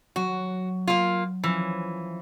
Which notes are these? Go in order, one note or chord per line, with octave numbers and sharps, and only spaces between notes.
F#3 F#4
A#3 F4
E3 F3 C#4